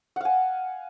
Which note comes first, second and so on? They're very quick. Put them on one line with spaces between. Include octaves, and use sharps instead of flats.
F#5 F5 G#5